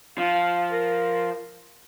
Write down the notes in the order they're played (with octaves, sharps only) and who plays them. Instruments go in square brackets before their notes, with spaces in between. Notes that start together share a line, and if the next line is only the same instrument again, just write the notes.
[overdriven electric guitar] F3 [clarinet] F5
[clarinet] A#4